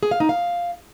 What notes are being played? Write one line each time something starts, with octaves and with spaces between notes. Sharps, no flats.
G#4
F5
D#4
F5